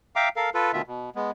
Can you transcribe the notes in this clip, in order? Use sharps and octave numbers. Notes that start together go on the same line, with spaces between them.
E5 F5 G5 A#5 D6
A4 A#4 F5
F4 A4 B4
D2 B2 D#3 F4 E5
B2
G#3 B3